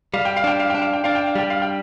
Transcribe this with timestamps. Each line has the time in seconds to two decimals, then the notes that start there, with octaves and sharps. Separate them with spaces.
0.13 G3 F5
0.25 G5
0.36 F5
0.44 D4 G5
0.60 F5
0.70 D4 G5
0.81 F5
0.93 G5
1.04 D4 F5
1.15 G5
1.27 F5
1.35 G3 G5
1.50 F5
1.62 G5